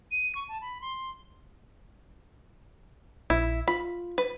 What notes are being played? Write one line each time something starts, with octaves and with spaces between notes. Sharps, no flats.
D#7
C#6
A5
B5
C6
A#1 E4
F4 B5
B4